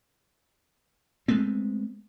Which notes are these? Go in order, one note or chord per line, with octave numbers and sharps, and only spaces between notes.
G#3 A3 B3 C4